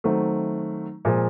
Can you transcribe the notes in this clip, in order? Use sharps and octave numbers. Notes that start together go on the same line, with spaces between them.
D#3 F#3 A3 C4
A#2 F3 G#3